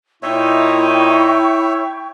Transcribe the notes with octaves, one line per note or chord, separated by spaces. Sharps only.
A#2 D#4 E4 C#5 E5 G5 C#6 G6